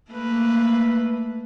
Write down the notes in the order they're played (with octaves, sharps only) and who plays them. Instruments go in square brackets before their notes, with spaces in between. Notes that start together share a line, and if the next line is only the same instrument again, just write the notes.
[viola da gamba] A3 A#3 B4